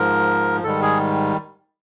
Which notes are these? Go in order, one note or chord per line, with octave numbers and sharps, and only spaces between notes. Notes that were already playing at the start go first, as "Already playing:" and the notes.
Already playing: G#2 F3 A#4
G#2 D#3 G3 A4
G#4